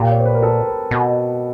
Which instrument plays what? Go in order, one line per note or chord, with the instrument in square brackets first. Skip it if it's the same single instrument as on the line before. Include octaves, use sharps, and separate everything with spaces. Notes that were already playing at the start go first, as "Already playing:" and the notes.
Already playing: [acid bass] A#2 [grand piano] G4
[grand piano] C#5
C5
B4
A#4
A4
B4
[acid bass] B2